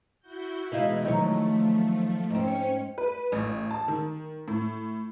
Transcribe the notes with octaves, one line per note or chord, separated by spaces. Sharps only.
E4 F#4 G6
B2 E3 G#3 D#4 E4 F5
D#3 F3 F#3 A3 C#5
G#2 C4 C#4 C#7
B4
A1
A5
D#3
A2